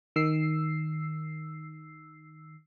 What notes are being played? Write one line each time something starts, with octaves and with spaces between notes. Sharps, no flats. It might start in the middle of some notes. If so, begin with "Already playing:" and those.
D#3 E6 C7